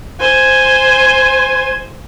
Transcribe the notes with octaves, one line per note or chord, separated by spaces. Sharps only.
C5 G#5